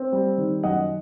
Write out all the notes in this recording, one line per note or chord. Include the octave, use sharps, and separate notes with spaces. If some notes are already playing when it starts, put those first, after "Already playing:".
Already playing: C4
G3
D#3
F#2 D#5 F#5